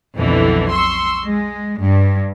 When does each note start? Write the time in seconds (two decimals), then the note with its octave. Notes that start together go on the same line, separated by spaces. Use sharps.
0.16 B1 F2 B2 D3 E3
0.73 C6 C#6 E6
1.24 G#3
1.79 G2